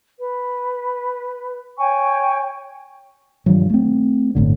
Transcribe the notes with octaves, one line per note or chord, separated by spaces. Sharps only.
B4
C#5 G5 G#5 C#6
G2 D#3 F3 F#3
A3 C4
G1 A2 D3